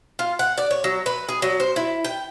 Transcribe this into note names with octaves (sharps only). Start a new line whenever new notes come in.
F4
F#5
D5
C#5
F#3
B4
G#4
F#3
C5
E4
G5